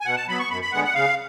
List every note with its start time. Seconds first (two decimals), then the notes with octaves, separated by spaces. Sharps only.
0.01 G#5
0.05 B2 F#5
0.17 A5
0.29 F#3 B3 B5
0.39 C#6
0.50 F#2 B5
0.62 B5
0.72 D3 G#3 B3 F#5
0.84 F#5
0.95 C#3 F5